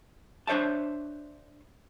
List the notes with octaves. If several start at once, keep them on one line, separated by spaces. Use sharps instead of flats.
D4 C5 C#5 E5 A5